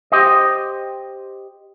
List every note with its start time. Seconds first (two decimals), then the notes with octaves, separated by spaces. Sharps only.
0.12 G4 C5 D#5